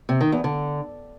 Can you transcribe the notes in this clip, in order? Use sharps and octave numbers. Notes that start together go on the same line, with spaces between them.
C3
D#3
E2
D3